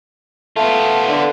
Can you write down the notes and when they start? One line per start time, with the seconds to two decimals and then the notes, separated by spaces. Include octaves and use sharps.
0.56 A3 B3 F4
1.09 D3